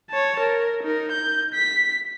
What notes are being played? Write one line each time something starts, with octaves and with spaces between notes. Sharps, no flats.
C#5 A5
A#4
D#4 A#4
G6
B6